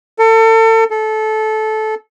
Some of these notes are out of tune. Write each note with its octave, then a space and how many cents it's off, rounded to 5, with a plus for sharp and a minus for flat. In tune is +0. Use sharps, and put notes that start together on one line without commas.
A4 +35
A4 -20